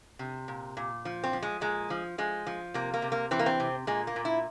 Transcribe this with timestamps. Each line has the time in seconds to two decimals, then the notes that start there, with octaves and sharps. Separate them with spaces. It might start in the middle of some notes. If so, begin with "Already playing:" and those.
0.19 C3
0.48 A#2
0.77 A#2
1.05 F3
1.24 C4
1.33 F3
1.43 G#3
1.61 A#2 G#3
1.90 F3
2.18 F3 G#3
2.47 F3
2.74 C3 A#3
2.94 A#3
3.02 C3
3.12 A#3
3.31 E3 C4
3.39 A#3
3.46 C4
3.60 C3
3.87 A#2 G#3
4.07 A#3
4.16 A#2
4.25 E4